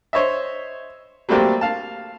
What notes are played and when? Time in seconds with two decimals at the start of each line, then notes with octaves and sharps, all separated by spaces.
0.13 C5 C#5 D#5 E5
1.29 F#3 G3 A3 A#3 C4 G4
1.61 F5 A5